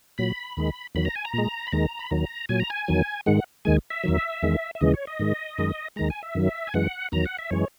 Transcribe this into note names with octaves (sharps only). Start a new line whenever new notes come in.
A#2 F#3 B5
D#2 D#3 G#3
E2 D#3 F#3 B5
A#5
G#5
A#5
A#2 G#3
B5
D#2 D#3 G#3 A#5
B5
D#2 D#3 F#3 A#5
A#2 F#3 G#5
A#5
G#5
E2 D#3 F#3
G#2 D#3 G#3 F#5
D#2 D#3 G#3 G#5
E5
E2 D#3 F#3
E2 D#3 G#3
E5
D#2 C#3 E3 G#3 D#5
C#5
D#5
G#2 D#3 G#3
F#2 D#3 G#3
D#2 D#3 G#3 A#5
G#5
E5
F#2 D#3 F#3
G#5
F#2 E3 G#3 F#5
E2 D#3 F#3 A#5
F#5
E5
F#2 E3 G#3 C#5